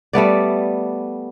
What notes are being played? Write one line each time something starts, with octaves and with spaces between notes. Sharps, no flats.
G3 A3 B3 D5